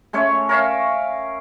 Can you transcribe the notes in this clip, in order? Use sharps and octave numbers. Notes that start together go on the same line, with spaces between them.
G#3 A3 C#4 C#5
A#4 C#5 E5 F5